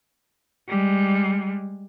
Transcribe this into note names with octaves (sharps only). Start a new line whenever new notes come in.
G3 G#3